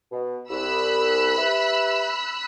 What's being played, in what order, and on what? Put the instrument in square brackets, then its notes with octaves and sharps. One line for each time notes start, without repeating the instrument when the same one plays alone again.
[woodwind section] B2
[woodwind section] C2 [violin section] B5 E6 F#6
[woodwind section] G4 B4 E5